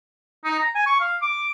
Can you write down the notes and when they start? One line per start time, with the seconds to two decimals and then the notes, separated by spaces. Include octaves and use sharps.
0.44 D#4
0.59 A#5
0.75 G#5
0.86 C#6
1.00 F5
1.21 D6